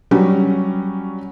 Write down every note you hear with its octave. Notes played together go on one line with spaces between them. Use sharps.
F#3 G3 C#4